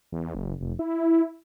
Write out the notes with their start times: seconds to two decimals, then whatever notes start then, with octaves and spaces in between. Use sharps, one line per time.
0.12 E2
0.35 F#1
0.61 F1
0.79 E4